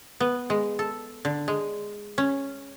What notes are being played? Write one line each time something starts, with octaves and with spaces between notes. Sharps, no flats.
B3
G#3
A4
D3
G#3
C#4